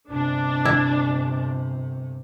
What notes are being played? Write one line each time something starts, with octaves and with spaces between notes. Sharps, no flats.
G1 C3 D4
E4